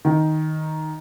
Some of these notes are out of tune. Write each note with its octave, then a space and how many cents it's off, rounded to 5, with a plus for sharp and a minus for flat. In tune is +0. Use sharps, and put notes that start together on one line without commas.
D#3 +5